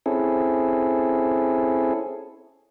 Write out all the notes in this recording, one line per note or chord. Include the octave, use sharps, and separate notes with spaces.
C4 C#4 E4 G#4 A4